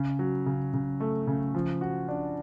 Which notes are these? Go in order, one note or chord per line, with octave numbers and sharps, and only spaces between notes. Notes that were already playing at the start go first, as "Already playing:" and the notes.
Already playing: C#3
F#3
C#3
C#3
A3
C#3
F3
F#4
D4